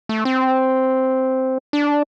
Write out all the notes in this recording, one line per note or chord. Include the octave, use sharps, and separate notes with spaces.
A3
C4
D4